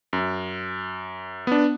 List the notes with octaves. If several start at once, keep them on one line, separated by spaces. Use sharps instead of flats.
F#2
B3 D4